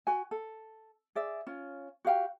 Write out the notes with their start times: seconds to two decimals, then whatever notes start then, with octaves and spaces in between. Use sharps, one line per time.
0.07 F#4 G#5
0.31 A4
1.15 G#4 D5 E5
1.47 C#4 F4
2.05 F#4 G4 F5 G5